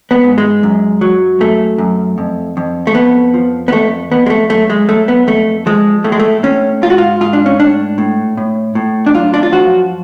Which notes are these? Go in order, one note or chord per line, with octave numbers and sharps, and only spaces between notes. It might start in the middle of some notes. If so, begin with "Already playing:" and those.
B3
G#2
G#3
F#2
F#3
F#2 A3
F#2
F2
F2
A3
F2 B3
F3
B3
F2 A3
F2 B3
G#3
A3
F#2 A3
G#3
F#2 A3
B3
F2 A3
F3 G#3
A2 A3
G#3
A3
A2 C#4
G#2 F4
F#4
F4
G#2 F4
D4
C#4
A2 D4
A2
A2
A2
D4
F#2 F4
D4
F4
F3 F#4